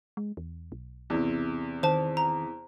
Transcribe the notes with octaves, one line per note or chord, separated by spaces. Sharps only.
G#3
E2
B1
E2 C3
D#3 C5 A5
A#5